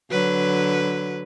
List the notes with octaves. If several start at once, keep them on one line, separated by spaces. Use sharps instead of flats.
D3 F#3 B4